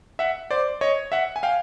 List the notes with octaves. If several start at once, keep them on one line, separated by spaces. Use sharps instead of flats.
E5 F#5
C5 D5
C#5 D#5
E5 F#5
G#5
F5 G5